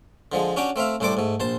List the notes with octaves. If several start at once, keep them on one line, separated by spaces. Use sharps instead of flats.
D3 F3 G#3
C#4 D4 F#4 G4 G5
A3 C4 E5 F5
C2 A2 A3 C5 D5 D6
G#2 A3
A#1 C5 A5 C6